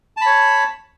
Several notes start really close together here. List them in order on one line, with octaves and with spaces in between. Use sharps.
A5 B5 C#5